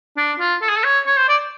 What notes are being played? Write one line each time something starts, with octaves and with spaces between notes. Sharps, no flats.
D4
F4
A4
G#4
A4
C#5
C#5
C5
D5